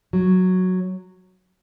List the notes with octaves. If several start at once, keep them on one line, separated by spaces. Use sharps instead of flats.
F#3